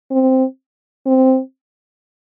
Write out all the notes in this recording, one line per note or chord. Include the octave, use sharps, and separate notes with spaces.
C4
C4